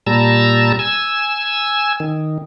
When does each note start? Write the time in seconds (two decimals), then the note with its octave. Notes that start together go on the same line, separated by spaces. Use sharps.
0.07 A#2 G3 A5 A#5 E6
0.79 G#5 E6
2.00 D#3